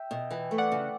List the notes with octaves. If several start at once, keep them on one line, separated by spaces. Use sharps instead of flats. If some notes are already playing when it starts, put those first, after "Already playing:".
Already playing: E5 G5
B2
E3
A3
D5 F#5
C#3